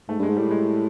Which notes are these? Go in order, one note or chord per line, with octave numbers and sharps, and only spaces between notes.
G#2 A3
G2 G#3
G#2
A2 G3
G#3